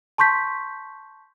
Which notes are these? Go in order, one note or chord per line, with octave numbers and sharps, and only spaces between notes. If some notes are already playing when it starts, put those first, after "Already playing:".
A5 C6 C#6 G6 B6